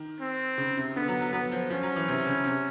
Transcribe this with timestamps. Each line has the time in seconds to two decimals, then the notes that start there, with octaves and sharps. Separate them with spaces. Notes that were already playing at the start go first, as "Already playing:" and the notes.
Already playing: D#3
0.20 C4
0.58 C#3
0.77 C3
0.96 D3 B3
1.08 F#3
1.21 F#3
1.33 F#3 B3
1.52 F3
1.70 F3 C#4
1.83 F#3
1.96 E3
2.08 C3
2.27 C#3
2.45 C3